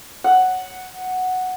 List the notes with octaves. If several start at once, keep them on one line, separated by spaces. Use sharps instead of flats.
F#5